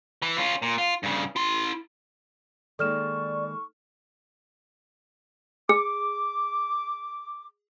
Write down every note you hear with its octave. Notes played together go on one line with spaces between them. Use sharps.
E3 E4
C#4 F4
A#2
F4
G2 C#3
E4 C6
D#3 G#3 A#3 A4 D5 C#6 F6 E7
G#4 D6